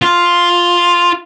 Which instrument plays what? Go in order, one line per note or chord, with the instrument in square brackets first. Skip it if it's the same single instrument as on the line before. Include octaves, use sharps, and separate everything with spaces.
[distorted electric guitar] F4